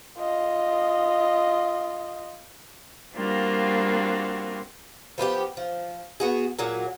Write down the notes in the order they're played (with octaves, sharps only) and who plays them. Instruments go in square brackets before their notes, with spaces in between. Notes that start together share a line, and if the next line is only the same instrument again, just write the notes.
[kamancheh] F4 D#5
[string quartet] G3 A#3 C4 D4 F4 F#4
[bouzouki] F3 B3 D4 G4
F3
B3 F#4 G#4
A#2 F#3 G#4